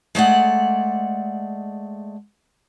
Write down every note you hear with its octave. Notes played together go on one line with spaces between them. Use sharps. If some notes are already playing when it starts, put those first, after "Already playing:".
G#3 A3 D5 F#5